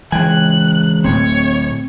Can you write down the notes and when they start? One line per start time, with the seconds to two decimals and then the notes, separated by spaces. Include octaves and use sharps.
0.12 C#2 E3 G#3 G5 G#5 F#6
1.04 D1 A2 C4 C#5